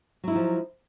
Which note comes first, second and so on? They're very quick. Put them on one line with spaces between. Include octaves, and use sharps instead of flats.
F#3 E4 D#4 F3